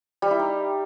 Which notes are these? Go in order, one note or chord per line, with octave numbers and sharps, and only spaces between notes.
G3
E4
D#4